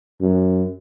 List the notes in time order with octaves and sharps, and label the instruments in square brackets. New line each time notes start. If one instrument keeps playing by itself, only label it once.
[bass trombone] F#2